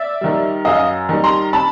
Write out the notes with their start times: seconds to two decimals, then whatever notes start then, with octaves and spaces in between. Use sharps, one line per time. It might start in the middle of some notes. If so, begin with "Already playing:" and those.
Already playing: D5 E5
0.21 D#3 G3
0.65 F#2 D#5 F5
1.09 D#3 G3
1.24 A#5 C6
1.53 A5 B5